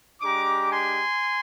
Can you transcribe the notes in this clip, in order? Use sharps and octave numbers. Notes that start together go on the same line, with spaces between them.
G#3 D4 G4 A#5 D6
G#5 C6